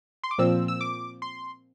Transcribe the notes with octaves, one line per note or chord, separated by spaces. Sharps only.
C6
D6
A#2 F3 C4 E6
E6
D6
C6